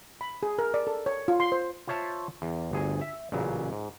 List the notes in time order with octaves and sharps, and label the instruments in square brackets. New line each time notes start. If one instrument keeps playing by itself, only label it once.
[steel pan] B5
G#4
A#4
D5
A4
C#5
F4
C6
C5
[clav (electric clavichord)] F4 C5 C#5 E5 A5
E2
G1 D2 G#4
E5
A1 A#2 C#3 F#3
G#2